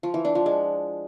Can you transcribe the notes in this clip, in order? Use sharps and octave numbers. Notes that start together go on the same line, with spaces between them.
F3
E3
D4
F3
G#3